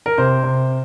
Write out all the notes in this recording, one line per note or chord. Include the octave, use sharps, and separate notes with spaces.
A#4
C3 C5
C3